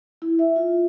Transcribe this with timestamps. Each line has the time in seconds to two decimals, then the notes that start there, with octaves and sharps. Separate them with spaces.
0.22 E4
0.39 E5
0.56 F4